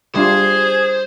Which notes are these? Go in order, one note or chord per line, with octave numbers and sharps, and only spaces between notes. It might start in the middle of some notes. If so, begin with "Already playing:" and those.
G3 D4 F4 G#4 C5